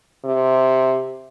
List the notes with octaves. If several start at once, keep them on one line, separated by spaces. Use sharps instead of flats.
C3